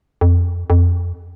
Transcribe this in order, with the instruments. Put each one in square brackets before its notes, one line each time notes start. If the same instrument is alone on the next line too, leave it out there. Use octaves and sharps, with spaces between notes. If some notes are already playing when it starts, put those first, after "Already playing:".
[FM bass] F2
F2